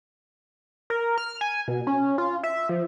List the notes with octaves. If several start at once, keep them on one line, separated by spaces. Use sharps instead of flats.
A#4
F6
G#5
B2
C#4
F4
E5
F3